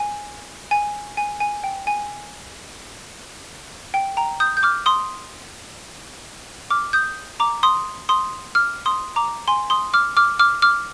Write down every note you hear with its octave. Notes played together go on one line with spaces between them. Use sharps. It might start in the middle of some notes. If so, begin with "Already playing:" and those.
Already playing: G#5
G#5
G#5
G#5
G5
G#5
G5
G5 A#5
D#6 G6
G6
D6 F6
C6 D#6
D6 F6
D#6 G6
A#5 D6
C6 D#6
C6 D#6
D6 F6
C6 D#6
A#5 D6
G#5 C6
C6 D#6
D6 F6
D6 F6
D6 F6
D6 F6